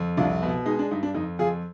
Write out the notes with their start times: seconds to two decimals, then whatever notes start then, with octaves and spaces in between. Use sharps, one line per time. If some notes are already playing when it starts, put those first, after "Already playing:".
Already playing: F2
0.17 C2 D4 F4
0.43 B2
0.66 G#3 D#4
0.79 D4
0.91 G2 D#4
1.03 D4
1.15 F2 D#4
1.39 F2 F4 G#4